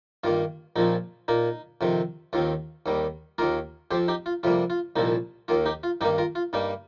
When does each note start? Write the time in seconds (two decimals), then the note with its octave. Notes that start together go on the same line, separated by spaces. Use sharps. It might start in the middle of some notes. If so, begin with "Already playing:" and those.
0.24 G2 D#3 A#3 F4
0.76 A#1 A#2 F3 C4 D#4
1.28 A#2 A#3 D#4
1.81 F2 C3 D#3 C4
2.33 D#2 D#3 C4 F4
2.86 D#2 D#3 G3
3.38 D#2 D#3 A#3 F4 A#4
3.91 F2 F3 C4 G4 C5
4.08 D#4 G4
4.26 F4
4.43 F2 C3 G3 A#3 F4
4.70 F4
4.96 C2 A#2 F3 C4 D#4
5.48 D#2 D#3 A#3 F4
5.66 D#4 G4
5.83 F4
6.01 G2 D#3 A#3 D#4 G4
6.18 F4 A#4
6.35 F4
6.53 G2 G3 A#3 D#4